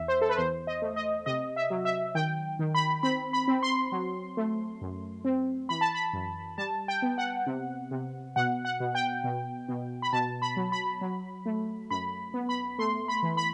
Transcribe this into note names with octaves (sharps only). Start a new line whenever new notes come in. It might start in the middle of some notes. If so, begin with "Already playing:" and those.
Already playing: E2 E5
C5
A4
B4
E2 C5
D#5
A3
D#5
C3 D#5
E5
F#3
E5
D#3 G5
D#3
B5
C4 B5
B5
C4
C6
F#3
A3
F#2
C4
E3 B5
A5
B5
F#2
G3 A5
G5
B3
F#5
C3
C3
B2 F#5
F#5
B2
G5
B2
B2
B5
B2 A5
B5
F#3
B5
F#3
A3
F#2 B5
B3
B5
A3 C6
B5
E3
B5